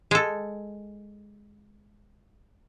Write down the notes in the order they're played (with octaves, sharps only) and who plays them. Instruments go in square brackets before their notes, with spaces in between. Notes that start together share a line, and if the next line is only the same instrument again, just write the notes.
[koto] G#3 A4